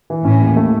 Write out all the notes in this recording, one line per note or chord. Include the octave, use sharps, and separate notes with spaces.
E3
A2 C#4
D#2
A3